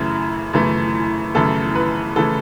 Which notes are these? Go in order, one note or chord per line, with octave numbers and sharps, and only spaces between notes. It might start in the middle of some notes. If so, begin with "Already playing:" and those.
Already playing: F#2 C#3 E3 A3 E4
F#2 C#3 E3 A3
F#2 C#3 E3 A3 A4
B4
C#3 E3 A3 A4